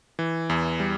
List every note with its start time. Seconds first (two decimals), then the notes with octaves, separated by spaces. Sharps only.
0.19 E3
0.50 E2
0.80 G3